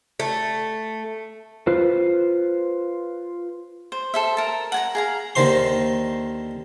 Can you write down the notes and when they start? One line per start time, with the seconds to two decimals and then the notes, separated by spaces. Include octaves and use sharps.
0.20 A3
1.67 F4 B4 C5
3.92 C5
4.14 A4 C5 E5
4.37 A#4 A5
4.72 F#5 G#5 A#5
4.95 G#4 F5 A#5
5.35 D#2 D3 D#3 C5 C6